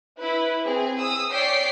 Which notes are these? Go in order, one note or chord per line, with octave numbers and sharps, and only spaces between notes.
E4 B4
C4 G#4
D#6 E6
C#5 D5 G5 B6 C7 D7